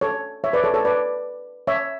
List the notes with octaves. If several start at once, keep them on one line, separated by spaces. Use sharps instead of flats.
A4 C#5
C#5 E5
B4 D5
A4 C#5
A4 C#5
B4 D5
C#5 E5